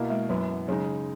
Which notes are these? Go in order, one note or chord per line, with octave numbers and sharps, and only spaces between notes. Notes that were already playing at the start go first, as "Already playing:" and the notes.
Already playing: B2 A#3 E4
G#3
F#2 E3 F#3 B3
C#3 F#3 G#3 D#4